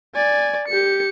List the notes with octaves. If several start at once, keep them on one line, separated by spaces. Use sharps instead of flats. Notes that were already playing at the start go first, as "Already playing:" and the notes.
D5 G#5
G4 C#7